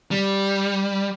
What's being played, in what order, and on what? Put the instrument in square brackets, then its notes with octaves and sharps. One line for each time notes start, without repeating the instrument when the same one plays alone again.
[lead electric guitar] G3